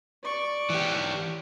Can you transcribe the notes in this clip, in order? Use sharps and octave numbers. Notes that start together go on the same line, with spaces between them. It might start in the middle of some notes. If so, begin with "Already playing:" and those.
D5 C#6
E3 G4